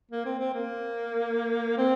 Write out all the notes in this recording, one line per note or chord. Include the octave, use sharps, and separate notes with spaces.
A#3
C4
C4
A#3
C4